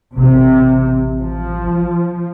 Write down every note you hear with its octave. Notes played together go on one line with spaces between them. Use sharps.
A1 C3
F3